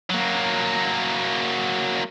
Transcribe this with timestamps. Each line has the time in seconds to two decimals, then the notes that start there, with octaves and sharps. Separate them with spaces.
0.10 F#3 A#3